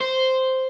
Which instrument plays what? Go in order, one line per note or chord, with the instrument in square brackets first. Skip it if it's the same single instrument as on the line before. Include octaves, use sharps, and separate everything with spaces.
[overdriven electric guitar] C5